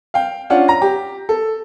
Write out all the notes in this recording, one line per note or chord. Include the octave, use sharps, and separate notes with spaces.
F5 G5
C#4 D4 F4 F#5
A#5 A#6
G4
A4